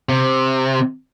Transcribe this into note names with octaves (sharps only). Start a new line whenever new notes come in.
C3